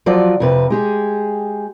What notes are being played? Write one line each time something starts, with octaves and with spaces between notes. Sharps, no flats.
F3 F#3 F4 D5
F2 C3 B4
G#3 G4 G#4